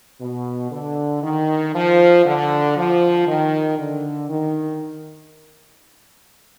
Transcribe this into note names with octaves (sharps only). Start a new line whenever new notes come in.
B2
D3
D#3
F3
D3
F3
D#3
D3
D#3